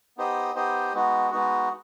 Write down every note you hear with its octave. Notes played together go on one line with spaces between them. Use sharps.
B3 D#4 G4 C5 D#5
B3 D#4 G4 C5 D#5
G#3 B3 D#4 F#4
G#3 B3 D#4 F#4